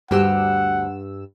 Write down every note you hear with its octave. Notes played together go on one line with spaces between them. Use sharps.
D2 G2 F#4 G4 F#5 E6